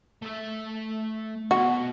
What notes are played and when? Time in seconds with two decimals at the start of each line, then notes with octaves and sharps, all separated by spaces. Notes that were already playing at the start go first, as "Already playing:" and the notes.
0.22 A3 E5
1.51 D2 B2 F#4